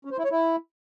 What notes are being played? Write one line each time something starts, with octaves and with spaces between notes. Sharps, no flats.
C#4
C5
E4
C#5
E4